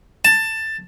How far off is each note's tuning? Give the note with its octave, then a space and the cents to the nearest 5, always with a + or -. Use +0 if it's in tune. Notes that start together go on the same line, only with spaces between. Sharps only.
A5 +10